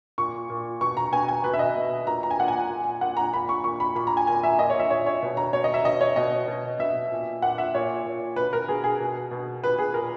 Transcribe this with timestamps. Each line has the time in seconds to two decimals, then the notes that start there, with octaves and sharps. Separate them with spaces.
0.18 A#2 C#6
0.50 A#2
0.81 B2 C#6
0.97 A#5
1.12 B2 G#5
1.28 G#5
1.44 B2 B4
1.53 E5
1.59 D#5
1.76 B2
2.06 A#2 A#5
2.23 A#5
2.31 G#5
2.39 A#2 F#5
2.48 G#5
2.70 A#2
3.01 A#2 F#5
3.17 A#5
3.33 A#2 B5
3.49 C#6
3.64 A#2 C#6
3.80 B5
3.95 A#2 B5
4.07 A#5
4.17 G#5
4.27 A#2 G#5
4.43 E5
4.58 A#2 D#5
4.70 C#5
4.79 E5
4.90 A#2 C#5
5.06 C#5
5.22 B2
5.37 A#5
5.53 B2 C#5
5.64 D#5
5.74 E5
5.85 B2 D#5
6.01 C#5
6.16 B2 D#5
6.48 B2
6.79 B2 E5
7.11 A#2
7.42 A#2 F#5
7.58 E5
7.74 A#2 C#5
8.06 A#2
8.36 B2 B4
8.53 A#4
8.68 B2 G#4
8.84 G#4
9.00 B2
9.31 B2
9.63 A#2 B4
9.79 G#4
9.94 A#2 A#4